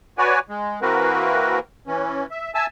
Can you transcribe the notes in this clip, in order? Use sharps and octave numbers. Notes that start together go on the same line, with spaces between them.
F#4 B4 C#5 D5 G#5
G#3
E3 A#3 C4 F#4 A#4 B4
E3 C#4
E5
E5 G#5 A5 E6